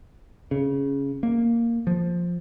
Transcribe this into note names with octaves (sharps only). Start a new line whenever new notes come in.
C#3
A#3
F3